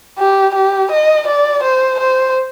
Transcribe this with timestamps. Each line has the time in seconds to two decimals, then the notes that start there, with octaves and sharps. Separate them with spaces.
0.19 G4
0.55 G4
0.91 D#5
1.27 D5
1.63 C5
2.00 C5